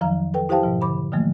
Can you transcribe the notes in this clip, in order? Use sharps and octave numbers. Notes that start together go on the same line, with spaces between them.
F2 D#3 F3 F#3 F5 A#5
A4 B4 G5
E4 G4 C5 F5 G5 A5
G#2 B2 F3
D3 B5 D6
D#3 F3 F#3 A3 A#3